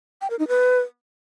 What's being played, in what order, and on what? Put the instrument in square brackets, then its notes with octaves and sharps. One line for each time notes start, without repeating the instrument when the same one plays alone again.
[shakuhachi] G5
A#4
D#4
B4